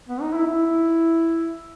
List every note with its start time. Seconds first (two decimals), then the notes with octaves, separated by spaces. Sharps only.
0.09 B3
0.21 D#4
0.34 E4
0.47 E4